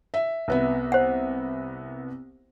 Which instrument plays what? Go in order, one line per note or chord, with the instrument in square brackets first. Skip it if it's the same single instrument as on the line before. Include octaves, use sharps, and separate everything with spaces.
[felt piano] E5
C2 B3 E5
[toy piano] C5 F#5